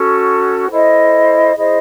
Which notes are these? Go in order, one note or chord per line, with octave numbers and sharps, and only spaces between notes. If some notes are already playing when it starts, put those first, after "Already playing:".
Already playing: C#4 F#4 A4
E4 A4 C5 D#5
E4 G#4 C5 D#5